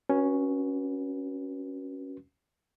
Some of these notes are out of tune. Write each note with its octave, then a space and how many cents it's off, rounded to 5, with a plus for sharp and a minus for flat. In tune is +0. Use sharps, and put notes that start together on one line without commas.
C#4 +0 F#4 +0 B4 -35